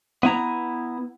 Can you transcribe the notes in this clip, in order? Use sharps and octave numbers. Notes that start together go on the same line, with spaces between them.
B3 E4 A#5